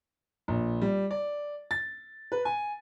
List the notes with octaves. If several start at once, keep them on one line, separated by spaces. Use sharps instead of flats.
A#1
G3
D5
A6
B4
G#5